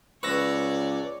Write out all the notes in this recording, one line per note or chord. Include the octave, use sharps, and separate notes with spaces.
C#2 B4 C#5 D5 C#6 E6 A#6